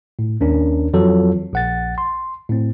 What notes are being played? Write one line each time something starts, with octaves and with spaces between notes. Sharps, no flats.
A2
D#2 C#4 D4 A#4
F2 E3 F#3 F4 A4
A#1 F#5 A6
C6
A2 C4